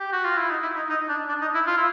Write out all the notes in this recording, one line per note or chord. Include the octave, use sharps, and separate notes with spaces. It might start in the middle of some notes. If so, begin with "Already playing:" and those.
G4
F#4
F4
E4
D#4
E4
D#4
D#4
D4
D4
D#4
E4
F4
E4